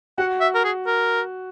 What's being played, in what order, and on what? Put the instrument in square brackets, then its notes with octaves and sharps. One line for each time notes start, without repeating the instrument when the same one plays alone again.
[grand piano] F#4 [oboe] F#5
[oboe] E5
A#4
G#4
A#4